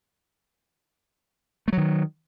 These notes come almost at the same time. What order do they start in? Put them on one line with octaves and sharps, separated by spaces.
A3 F#3 D#3